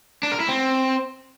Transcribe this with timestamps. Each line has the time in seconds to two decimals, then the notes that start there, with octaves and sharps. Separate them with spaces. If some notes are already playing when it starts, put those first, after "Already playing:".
0.23 D4
0.32 A#4
0.40 E4
0.49 C4